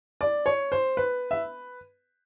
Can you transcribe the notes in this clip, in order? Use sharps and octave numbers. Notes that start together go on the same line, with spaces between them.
D5
C#5
C5
B4
E5